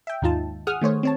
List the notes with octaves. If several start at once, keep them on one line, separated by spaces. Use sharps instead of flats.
E5 G5
D#2 G#2 D#4 F4 A5
G#4 F#5 D#6 F6
D#3 A3 C5 C#5
C4 C#5 A5